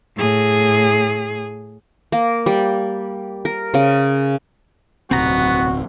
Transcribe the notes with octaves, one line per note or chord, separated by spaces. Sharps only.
A2 G#4
A#3
G3
A#4
C#3
D1 B1 C3 B3 C4 F#4 A#5